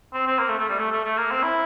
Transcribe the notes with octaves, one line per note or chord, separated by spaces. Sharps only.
C4
C4
A#3
A3
A3
G3
A3
A3
A3
A#3
C4
E4